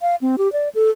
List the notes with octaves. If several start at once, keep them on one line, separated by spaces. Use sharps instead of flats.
F5
C4
G4
D5
A4